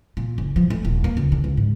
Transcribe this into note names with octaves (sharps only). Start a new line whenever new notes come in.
A#2
F#1
F3
A3
D#1
A#3
C#2
D3
C#2
G#2